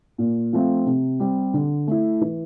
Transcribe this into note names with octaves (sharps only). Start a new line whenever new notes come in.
A#2
F3 A3 C4 F4
C3
G3 C4 G4
D3
A3 E4
E3